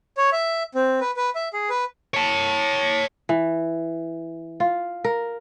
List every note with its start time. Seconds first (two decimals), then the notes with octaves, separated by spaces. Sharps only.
0.17 C#5
0.32 E5
0.75 C4
1.01 B4
1.17 B4
1.35 E5
1.53 G#4
1.70 B4
2.14 C#5 A5
3.29 E3
4.60 F4
5.04 A#4